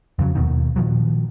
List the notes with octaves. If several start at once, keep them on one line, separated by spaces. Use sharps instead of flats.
F2 C#3 E3 F#3
D#2 B2 D#3
A#2 D#3 F3 F#3